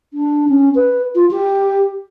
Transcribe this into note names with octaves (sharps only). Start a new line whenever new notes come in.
D4
C#4
B4
F4
G4